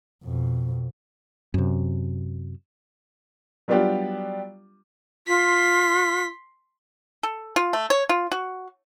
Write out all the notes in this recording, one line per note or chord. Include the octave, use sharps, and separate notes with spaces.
F2 B2
F#2 C3
F#3 G3 B3 D4 F4 G4
F4 C6 B6
A4
F4
A3
C#5
F4
F#4